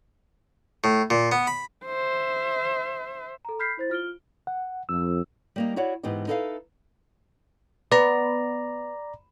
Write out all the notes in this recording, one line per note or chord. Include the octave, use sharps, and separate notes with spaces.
A2
A#2
B3
B5
C5 E5
A4 A#5
B5 F6 G6 B6 C7
E4 C5 A6
F4 F6 D7 G7
F#5
F2 E6
G3 A#3 D#4
E4 F#4 C#5 D5 F#5
G#2 E3 B3 D#4 G4
D#4 E4 A4 B4 E5 F5
B3 D5 A#5